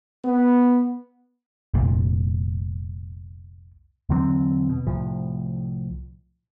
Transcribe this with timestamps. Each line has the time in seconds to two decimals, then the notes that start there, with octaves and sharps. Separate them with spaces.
0.25 B3
1.74 F1 C2 A#2
4.09 E2 D3 F#3 C4
4.70 B2
4.87 C2 A2 F3